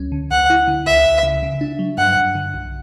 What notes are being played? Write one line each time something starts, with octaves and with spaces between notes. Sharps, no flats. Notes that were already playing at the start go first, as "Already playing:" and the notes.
Already playing: D2 F#3 C#4
D3
D2 F#5
E4
D3
C#2 E5
C#2
C#3
C#3
D4
F#3
G2 F#5
G2
D3
B1